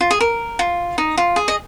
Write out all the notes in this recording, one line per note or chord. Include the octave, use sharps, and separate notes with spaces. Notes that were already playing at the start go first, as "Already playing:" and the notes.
F4
G#4
A#4
F4
D#4
F4
G#4
D#5